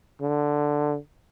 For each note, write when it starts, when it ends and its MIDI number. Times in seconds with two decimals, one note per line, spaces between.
0.21 0.97 50